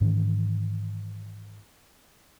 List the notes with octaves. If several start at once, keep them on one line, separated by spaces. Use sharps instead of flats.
G#2 D#3 E3 C#4